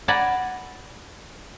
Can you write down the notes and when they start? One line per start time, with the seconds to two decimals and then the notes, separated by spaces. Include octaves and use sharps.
0.08 D5 F#5 G#5 A#5 B5